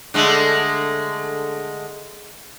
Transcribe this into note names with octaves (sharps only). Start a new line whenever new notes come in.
D3 G#3 A3